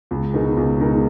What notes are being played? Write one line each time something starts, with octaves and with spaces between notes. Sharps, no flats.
C#2
B2 G#3 D#4 A#4
C#2
B2 G#3 D#4 A#4